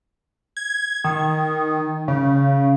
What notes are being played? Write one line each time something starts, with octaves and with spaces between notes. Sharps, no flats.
G#6
D#3
C#3